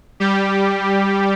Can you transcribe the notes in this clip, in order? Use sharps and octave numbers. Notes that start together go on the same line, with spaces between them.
G3 G4